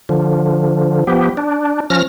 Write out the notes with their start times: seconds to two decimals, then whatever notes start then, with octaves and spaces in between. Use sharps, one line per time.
0.09 D3 F3
1.07 F3 B3 G4
1.37 D4
1.90 F3 C#4 F6 A#6